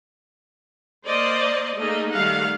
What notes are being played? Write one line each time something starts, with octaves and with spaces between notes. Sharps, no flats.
A#3 C5 D5 D#5
A3 A#3 D#4 G#4 D#5
D#3 G3 A3 F5 F#5